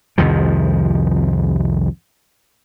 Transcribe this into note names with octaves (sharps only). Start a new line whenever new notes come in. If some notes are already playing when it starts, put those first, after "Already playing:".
C2 F2 D#3 F3